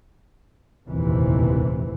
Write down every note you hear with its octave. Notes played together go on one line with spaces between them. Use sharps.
F1 A#1 D#2 C3 E3